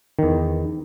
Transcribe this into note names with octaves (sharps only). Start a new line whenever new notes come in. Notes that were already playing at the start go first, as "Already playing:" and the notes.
E2 D#3